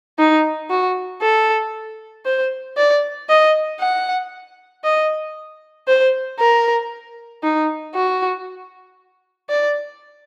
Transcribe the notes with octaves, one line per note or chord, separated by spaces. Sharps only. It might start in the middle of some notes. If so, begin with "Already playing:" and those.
D#4
F#4
A4
C5
D5
D#5
F#5
D#5
C5
A#4
D#4
F#4
D5